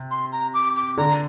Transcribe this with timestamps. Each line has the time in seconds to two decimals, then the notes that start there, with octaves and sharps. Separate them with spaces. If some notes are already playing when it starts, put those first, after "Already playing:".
Already playing: C3
0.11 C6
0.32 A#5
0.54 D6
0.76 D6
0.98 D3 A#5